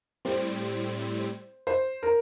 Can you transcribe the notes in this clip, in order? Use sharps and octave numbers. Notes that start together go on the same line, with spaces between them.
A2 G3 C4 C5
C5
A#4